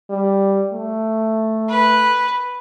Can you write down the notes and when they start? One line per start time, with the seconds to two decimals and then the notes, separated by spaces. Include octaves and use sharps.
0.10 G3
0.73 A3
1.69 B4